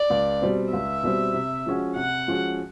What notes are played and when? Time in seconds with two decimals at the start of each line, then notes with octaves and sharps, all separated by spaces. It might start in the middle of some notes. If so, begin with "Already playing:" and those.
Already playing: D5
0.10 C#2
0.42 B2 G3 C4
0.73 C#2 E5
1.03 B2 G3 C4
1.34 C3
1.66 F3 G#3 C#4 F#4
1.96 C3 F#5
2.28 F3 G#3 C#4 F#4